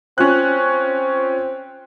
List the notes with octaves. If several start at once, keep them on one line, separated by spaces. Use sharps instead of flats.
C4 C#4 F4 F#6